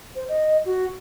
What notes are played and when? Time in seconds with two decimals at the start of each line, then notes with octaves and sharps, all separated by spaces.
0.15 C5
0.28 D#5
0.65 F#4